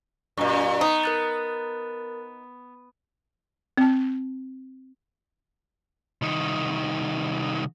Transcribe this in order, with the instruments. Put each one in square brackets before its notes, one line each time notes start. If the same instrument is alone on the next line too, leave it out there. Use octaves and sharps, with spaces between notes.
[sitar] F#2 A#2 [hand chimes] D#5 A#5 C#6
[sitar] B3 [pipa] D#4
[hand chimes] A#4 F#6 A6
[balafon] C4 A5
[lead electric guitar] C2 D#3